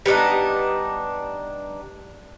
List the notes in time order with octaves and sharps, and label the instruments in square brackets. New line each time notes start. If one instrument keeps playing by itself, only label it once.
[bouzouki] G3 B3 D4 D#4